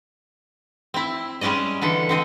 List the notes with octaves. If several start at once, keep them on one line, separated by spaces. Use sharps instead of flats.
C4 E4
G3 G#3 C#4 D5 D#5
D3 E3 A4
D3 C4 D#5